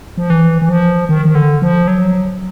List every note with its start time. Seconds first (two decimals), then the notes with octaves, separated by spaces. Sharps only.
0.18 F3
0.30 E3
0.62 E3
0.69 F3
1.09 D#3
1.25 D#3
1.35 D3
1.62 F3
1.88 F#3